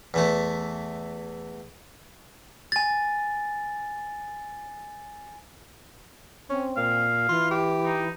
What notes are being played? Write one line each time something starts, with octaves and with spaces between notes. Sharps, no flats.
E2 E3 A3
G#5 A6
C4 C#4
A#2 F5
E3 F4
G4
D#4